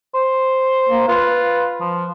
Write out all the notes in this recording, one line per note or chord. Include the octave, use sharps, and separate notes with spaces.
C5
A#3
F4 B4
F3